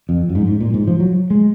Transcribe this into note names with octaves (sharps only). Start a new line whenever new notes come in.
F2
F#2
G#2
G#2
A#2
G#2
F3
F#3
G#3